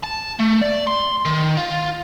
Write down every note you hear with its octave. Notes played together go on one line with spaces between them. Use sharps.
A5
A3
D5
C6
D#3
F4